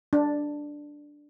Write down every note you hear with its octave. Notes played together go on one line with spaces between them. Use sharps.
D4